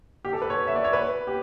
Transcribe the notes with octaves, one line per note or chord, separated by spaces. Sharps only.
G4
A4
B4
C#5
E5
D5
C#5
B4
G4